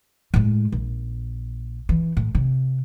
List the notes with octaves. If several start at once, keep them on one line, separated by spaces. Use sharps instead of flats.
A2 G#3
A#1
E3
A2
C3